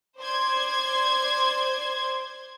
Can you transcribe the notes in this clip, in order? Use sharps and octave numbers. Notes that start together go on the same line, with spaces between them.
C5 D5 C6 G#6